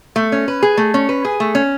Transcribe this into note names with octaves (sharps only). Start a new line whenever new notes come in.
A3
C#4
B4
G#4
A3
C#4
B4
G#4
A3
C#4